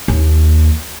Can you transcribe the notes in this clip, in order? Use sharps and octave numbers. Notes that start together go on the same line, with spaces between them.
D#2